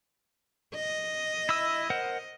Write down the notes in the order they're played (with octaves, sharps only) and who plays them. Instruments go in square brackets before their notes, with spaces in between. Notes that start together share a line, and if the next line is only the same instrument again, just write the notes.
[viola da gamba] D#5
[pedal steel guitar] E4 E6
A#4 C5 F#5